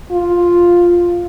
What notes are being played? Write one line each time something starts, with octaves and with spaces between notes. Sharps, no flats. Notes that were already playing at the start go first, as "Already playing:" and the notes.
F4